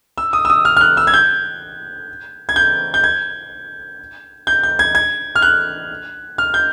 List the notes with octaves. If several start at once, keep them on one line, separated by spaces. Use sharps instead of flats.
E6
D#6
E6
D#6
F6
F6
F#6
E6
G#6
G6
G#6
G6
G6
G#6
G6
G6
G#6
G#6
F6
F#6
F6
G6